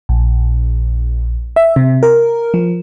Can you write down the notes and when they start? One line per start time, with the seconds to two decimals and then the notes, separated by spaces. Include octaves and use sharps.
0.09 A#1
1.56 E5
1.76 C3
2.03 A#4
2.54 F3